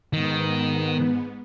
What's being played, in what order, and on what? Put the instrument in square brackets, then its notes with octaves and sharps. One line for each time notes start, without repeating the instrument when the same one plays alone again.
[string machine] G#2 B3 [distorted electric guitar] D#3